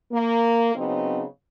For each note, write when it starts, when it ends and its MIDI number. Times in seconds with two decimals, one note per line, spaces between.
0.12 0.73 58
0.75 1.23 49
0.75 1.23 54
0.75 1.23 59
0.75 1.23 60
0.75 1.23 63